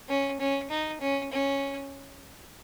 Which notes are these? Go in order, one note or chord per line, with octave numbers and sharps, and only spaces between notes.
C#4
C#4
D#4
C#4
C#4